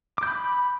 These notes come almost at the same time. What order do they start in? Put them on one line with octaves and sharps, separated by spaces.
D6 G6 B5